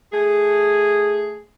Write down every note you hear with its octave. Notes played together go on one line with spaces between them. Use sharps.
A3 G#4